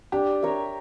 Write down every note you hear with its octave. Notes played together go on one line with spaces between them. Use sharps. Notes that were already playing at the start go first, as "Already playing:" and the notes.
D4 G4
A#4 C#5 E5